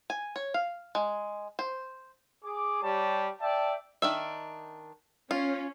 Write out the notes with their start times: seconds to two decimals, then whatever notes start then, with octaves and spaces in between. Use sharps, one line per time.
0.10 G#5
0.36 C#5
0.54 F5
0.95 G#3
1.59 C5
2.44 G#4 D6
2.82 G3 G4 C#5 A5
3.41 D5 E5 G5 A5
4.02 D#3 D4 E5
5.31 C#4 F4